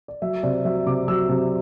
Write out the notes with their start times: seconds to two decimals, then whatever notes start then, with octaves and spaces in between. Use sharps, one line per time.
0.08 D5
0.22 F#3 E5
0.43 C3 D5
0.65 F#3 E5
0.86 C3 D6
1.08 F#3 E6
1.29 C3